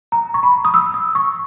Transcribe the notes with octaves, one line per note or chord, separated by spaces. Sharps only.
A#5
C#6
B5
D#6
E6
D#6
C#6